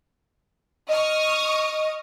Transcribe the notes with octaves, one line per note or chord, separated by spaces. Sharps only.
D#5 C#6 D#6 F6